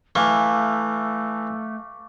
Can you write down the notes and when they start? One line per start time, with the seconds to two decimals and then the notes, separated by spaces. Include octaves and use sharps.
0.15 E3 A3 F5 C#6 D6